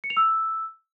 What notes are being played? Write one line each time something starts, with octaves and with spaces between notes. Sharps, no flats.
C#7
F7
E6